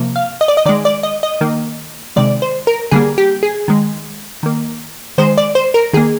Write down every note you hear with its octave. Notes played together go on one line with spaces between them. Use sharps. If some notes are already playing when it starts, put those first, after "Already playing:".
Already playing: C3 F3 A#3
F5
D#5
D5
D#5
D#3 G#3 D5
D5
D#5
D#5
D#3 A#3
C3 D#3 G#3 D5
C5
A#4
D3 G3 A#3 G#4
G4
G#4
D#3 G#3
D#3 A#3
D#3 G#3 C5
D5
C5
A#4
D#3 A#3 G#4